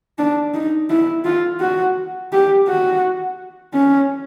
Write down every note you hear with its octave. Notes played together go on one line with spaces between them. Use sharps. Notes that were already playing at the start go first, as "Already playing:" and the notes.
D4
D#4
E4
F4
F#4
G4
F#4
C#4